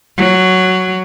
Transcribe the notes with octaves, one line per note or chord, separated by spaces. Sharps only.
F#3